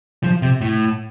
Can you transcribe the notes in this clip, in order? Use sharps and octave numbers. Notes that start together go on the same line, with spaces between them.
F3
C3
A2